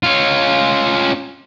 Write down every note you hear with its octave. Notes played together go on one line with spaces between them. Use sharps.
C#4 F4